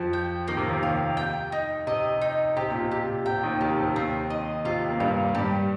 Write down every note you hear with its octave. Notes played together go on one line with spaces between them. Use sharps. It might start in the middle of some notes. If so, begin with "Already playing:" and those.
Already playing: F2 F3
G5
D#3 A#3
C3
D#2 D#3
F5
G5
D#4
C3 D#5
D#4
C3 G4
A#2
C3
G4
C3
C3 G5
D#2 D#3
D#2 D#3 G4
C3
D#2 D#3 C4
D#5
C3 F4
A#3
G2 G3 F5
G2 G3 G4